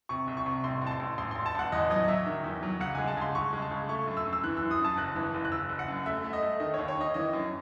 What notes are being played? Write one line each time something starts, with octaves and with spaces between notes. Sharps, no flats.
C3 C#6
C2
C#6
C3
A1 C6
A1 A5
C6
A1
A1 C6
A1 C6
A5
A1 F#5
E2 D#5
F#3 D#5
D#5
F#3 E5
D#3
E2
F#3
C#2 F#5
G#3 G#5
A5
C#2 C6
C#2 C#6
G#3
A5
C#2
A3 C#6
F#2
E6
F#2
E6
E3 F#6
E6
F#2
D#6
F#2
A5
F#1 F#6
E3
F#1
F#6
F#1 E6
F#1
F#5
F#2
A3 E5
A3
D#5
A3
D#3 D#5
D#2 C#5
C#5
D#3 D#5
E3 D#5
F#2